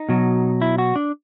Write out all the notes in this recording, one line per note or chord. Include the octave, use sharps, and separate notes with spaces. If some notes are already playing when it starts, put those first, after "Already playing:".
Already playing: D#4
B2 F#3
E4
F#4
D4